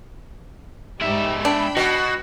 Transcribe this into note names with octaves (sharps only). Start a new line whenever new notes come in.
G#2 G3 G#3 D#4 E5
D4 G5 B5
B2 F#4